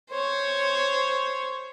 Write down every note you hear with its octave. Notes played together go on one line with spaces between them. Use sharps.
C5 C#5